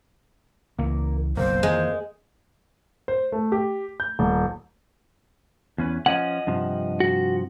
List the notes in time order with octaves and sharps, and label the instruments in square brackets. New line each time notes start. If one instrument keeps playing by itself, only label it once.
[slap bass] C#2 E3 [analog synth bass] A#3
[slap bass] F#1 B1 C3 [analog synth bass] A#3 [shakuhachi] C5
[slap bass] F2 D#3 E3 [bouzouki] G#3
[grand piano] C5
A3
G4
G6
D#1
[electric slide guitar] E2 C#4 B4
[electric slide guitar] F3 C#4 [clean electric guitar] D#5 F#5
[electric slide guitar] G2 C3 F3
[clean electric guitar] F#4